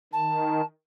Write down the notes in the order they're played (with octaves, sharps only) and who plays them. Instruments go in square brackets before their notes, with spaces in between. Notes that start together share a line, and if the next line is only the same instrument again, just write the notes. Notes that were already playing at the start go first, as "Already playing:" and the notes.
[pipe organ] D#3 [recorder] A5